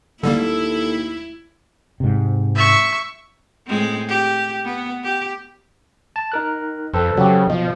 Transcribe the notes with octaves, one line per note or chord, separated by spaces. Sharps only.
D#2 D3 G3 A#3 E4 A4
G#2 C3
E5 C#6
A2 G#3 C4
G4
B3
G4
A5
D#4 A#4 F#6
F2 A4 B4 C5 G5
C#3 F#3 G4
B2 F3 D#5